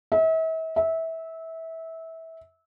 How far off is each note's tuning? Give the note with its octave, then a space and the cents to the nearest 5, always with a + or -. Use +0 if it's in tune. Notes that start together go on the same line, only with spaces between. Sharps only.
E5 -40
E5 -20